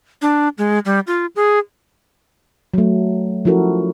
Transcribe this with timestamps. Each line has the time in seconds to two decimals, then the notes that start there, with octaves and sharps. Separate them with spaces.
0.22 D4
0.58 G#3
0.85 G3
1.07 F4
1.36 G#4
2.74 F#3 A3
3.45 F3 C#4 E4 F#4 A4 A#4